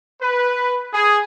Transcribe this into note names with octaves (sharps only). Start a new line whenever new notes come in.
B4
G#4